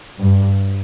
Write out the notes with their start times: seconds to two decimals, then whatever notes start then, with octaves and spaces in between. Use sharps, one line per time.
0.19 G2